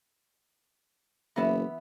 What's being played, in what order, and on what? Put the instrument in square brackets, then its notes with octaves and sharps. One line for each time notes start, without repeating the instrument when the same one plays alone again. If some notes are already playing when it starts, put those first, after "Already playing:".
[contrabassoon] F#1 [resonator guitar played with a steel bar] E3 B3 E5